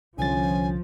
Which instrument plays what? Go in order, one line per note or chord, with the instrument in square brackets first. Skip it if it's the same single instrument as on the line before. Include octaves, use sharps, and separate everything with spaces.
[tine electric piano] C2 D3 A6 [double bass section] F3 [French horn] C#4 [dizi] G#5